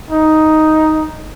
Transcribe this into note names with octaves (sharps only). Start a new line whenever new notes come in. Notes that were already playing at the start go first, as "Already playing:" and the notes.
D#4